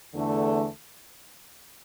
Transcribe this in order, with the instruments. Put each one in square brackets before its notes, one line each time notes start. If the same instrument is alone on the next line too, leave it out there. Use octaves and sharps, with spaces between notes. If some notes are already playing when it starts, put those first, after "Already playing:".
[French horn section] E2 D3 A3